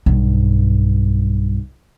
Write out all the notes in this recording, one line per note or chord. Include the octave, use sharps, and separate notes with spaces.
B1 G2